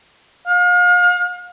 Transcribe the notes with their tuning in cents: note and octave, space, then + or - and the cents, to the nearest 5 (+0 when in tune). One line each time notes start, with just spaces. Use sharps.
F5 +35